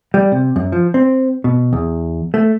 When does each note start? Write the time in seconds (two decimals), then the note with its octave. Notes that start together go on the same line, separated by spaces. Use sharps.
0.14 G3
0.32 C3
0.56 F#2
0.72 F3
0.94 C4
1.44 B2
1.73 E2
2.34 A3